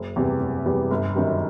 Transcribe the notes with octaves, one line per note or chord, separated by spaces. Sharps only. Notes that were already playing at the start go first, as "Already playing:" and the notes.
Already playing: F#1
E2 C3 E3 G3
F#1
E2 C3 E3 G3
G1
F#2 D#3 G3